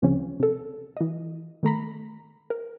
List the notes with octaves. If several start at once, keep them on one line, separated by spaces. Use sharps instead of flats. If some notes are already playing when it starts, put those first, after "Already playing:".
D2 C#3 F3 C4 C#4
C3 A4
E3 D#5
D#3 A3 A#5 B5
A#4